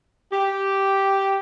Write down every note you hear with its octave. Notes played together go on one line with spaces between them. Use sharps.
G4